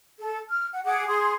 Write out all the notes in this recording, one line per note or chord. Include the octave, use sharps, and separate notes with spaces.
A4
F6
F#5
G#4 F#5 D6
G#4 C6 D#6